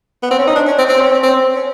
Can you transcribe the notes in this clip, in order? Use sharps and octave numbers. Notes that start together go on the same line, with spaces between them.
B3
C4
C#4
D#4
D4
C#4
C4
C4
C#4
C4
C4
C#4